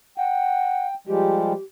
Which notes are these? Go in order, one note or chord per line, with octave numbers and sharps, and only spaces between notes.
F#5 G5
F3 G3 G#3 G4